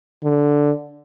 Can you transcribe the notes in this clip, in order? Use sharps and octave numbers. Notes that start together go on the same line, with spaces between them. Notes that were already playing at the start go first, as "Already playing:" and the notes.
D3